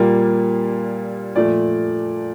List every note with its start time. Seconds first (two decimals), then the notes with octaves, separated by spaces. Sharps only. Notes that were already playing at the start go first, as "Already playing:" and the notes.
Already playing: A#2 G3 A#3 F4
1.35 A#2 F3 A3 D5